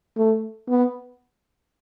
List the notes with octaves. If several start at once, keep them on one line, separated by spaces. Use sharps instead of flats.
A3
B3